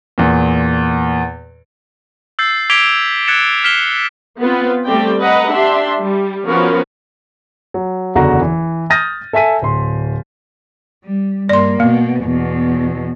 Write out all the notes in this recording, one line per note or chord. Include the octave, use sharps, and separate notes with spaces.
E2 A#2
E6 G6 A6 C7
D6 G#6 B6 D7 F7 G7
F#6 G#6 A6 C#7 E7
F6 B6 C7 E7 G7
B3 C4 F4 B4
G3 A3 C4 G4 D5 G5
B4 D#5 F#5 A#5
D4 G4 E5 C6
G3
F3 B3 C#4 F#4 A#4 B4
F#3
F#1 E2 D3 F#4 A#5
E3
D#6 F6 G6 A6 A#6 D#7
A4 E5 G#5 B6 D#7
D1 C6
G3
G2 A#3 D5 C6
B2 A#3
E2 B2